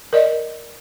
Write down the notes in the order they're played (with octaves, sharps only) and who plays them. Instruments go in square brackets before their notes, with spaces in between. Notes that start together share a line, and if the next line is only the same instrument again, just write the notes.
[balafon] A#4 D5 D#5